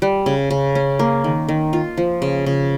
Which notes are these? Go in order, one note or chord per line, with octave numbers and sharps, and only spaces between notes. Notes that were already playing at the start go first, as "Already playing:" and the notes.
G3
C#3
C#3
C#4
A#3
D#3
D#3
F4
F3
C#3
C#3